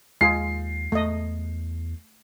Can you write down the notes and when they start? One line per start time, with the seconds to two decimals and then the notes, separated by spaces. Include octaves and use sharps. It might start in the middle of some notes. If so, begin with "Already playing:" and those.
0.21 D#2 G#3 F4 G#4 C7
0.92 E2 A3 D#5